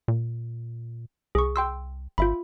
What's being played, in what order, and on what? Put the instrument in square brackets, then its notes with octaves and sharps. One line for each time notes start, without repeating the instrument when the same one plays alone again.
[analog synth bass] A#2
[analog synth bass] C2 [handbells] G#4 C#6
[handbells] G5 C6 E6
[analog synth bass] G#1 [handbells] F4 E5 B5